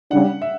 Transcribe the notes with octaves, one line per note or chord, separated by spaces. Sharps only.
C#3 G3 D4 F#5
E5